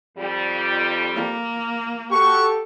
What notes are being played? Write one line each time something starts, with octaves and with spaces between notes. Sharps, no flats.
F2 G3
A#3
F#4 G4 A4 C#6